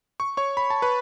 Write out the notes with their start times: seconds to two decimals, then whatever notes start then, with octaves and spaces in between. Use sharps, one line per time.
0.20 C#6
0.37 C#5 C#6
0.57 B5
0.70 A5
0.82 B4 B5